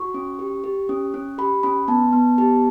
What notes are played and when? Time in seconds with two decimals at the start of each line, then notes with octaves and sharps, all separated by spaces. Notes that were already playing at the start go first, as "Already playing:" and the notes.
Already playing: F#4 C#6
0.14 C#4
0.39 G4
0.64 G4
0.89 C#4
1.14 C#4
1.38 G4 B5
1.63 C#4 B5
1.88 B3 A5
2.13 B3
2.38 G4 A5